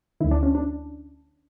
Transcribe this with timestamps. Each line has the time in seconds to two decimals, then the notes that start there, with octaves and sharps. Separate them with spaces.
0.20 D2 D3 E4
0.31 D4
0.43 C#4
0.55 D4